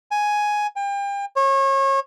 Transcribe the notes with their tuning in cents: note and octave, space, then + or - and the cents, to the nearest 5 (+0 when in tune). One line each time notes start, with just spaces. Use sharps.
G#5 +5
G5 +35
C#5 -30